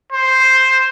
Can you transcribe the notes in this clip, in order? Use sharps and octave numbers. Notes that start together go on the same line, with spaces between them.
C5